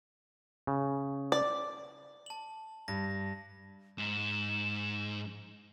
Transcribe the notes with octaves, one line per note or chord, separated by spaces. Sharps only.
C#3
D5
A5 F#7
G2 A#6
G#2 E7